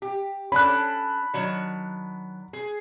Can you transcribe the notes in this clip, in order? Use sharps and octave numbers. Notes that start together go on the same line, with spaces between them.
G4
C#4 D4 A4 B5 F#6
D#3 F#3 D4
G#4